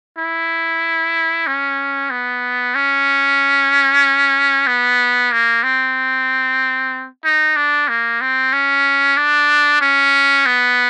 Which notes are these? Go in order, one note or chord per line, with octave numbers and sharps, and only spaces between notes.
E4
C#4
B3
C#4
B3
A#3
C4
D#4
D4
A#3
C4
C#4
D4
C#4
B3